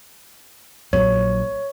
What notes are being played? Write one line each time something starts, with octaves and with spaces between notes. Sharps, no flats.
A#1 F#3 C#5